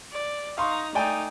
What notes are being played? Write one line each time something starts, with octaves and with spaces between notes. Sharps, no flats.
D5
D#4 F5 A#5 C6 C#6
A3 D#4 D5 G5 G#5